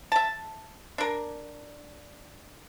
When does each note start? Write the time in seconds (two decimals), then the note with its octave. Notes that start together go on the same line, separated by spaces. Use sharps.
0.12 E5 A5
0.98 D4 A#4